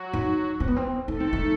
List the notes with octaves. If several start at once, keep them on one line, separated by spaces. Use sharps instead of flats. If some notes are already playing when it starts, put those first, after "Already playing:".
Already playing: F#3 F#4
D#4
C4
B3
C4
A3 D#4 A4
C4
D#4